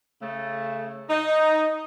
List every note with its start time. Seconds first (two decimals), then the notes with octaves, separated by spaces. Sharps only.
0.21 C#3 A3
1.10 D#4 D#5